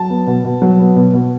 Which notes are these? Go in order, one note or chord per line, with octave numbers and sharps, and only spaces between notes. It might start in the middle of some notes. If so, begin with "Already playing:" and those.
Already playing: F#3 A5
B3
B2
B2
F#3
B3
B2
B2